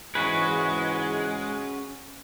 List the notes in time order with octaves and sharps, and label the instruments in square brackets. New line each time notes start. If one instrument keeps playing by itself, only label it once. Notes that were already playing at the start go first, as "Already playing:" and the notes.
[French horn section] G#2 E3 [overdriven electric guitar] G#3 [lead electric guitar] C#4 G#4 [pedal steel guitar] F#4 B4